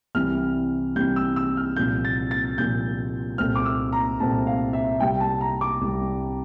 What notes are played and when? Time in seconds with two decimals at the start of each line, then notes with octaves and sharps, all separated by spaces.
0.15 C2 C3 E3 G3 F6
0.96 C2 C3 E3 G3 G6
1.16 E6
1.36 E6
1.57 F6
1.76 C2 A#2 F3 G6
2.05 A6
2.31 A6
2.58 C2 A#2 F3 G6
3.38 C2 A#2 A3 C4 F6
3.55 D6
3.65 E6
3.93 A#5
4.20 C2 A#2 A3 C4 A5
4.47 F5
4.73 E5
5.00 C2 C3 G3 G5
5.20 A5
5.41 A#5
5.61 D6
5.81 C2 C3 G3